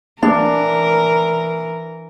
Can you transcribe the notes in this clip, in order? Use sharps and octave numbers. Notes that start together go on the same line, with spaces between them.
E3 D4 A#4